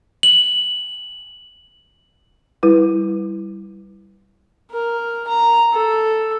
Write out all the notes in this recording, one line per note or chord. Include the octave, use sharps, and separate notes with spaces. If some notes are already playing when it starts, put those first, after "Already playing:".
F#7
G3 E4 B4
A#4
A#5
A4